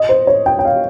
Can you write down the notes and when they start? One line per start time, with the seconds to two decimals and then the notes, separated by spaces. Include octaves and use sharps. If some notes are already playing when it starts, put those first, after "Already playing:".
Already playing: D#5
0.09 C5
0.27 C#5
0.46 G5
0.59 G5
0.65 F5